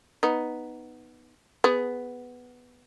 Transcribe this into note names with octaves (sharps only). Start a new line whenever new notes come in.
B3 D#4
B3 G#4